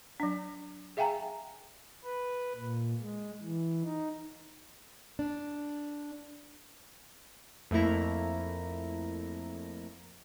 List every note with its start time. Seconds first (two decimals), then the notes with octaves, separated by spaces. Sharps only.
0.20 F#3 D4
0.97 G#4 E5 F5 G5 G#5 A#5
2.04 B4
2.54 A#2
3.00 G#3
3.42 E3
3.84 D#4
5.19 D4
7.71 F2 A3 A#3 E4 A#5